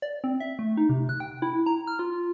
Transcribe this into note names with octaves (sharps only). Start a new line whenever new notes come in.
D5
C4
E5
A3
D#4
C3
F#6
G5
E4
A#5
F6
F4